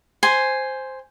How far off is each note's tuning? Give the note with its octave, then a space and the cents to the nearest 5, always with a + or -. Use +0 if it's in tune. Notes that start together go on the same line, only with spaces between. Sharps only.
C5 +0 G#5 +0 C6 +0